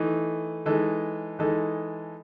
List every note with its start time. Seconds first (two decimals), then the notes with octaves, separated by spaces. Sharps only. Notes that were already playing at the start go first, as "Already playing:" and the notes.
Already playing: E3 A3 D#4
0.66 E3 G#3 D#4 A4
1.39 E3 G#3 D#4 A4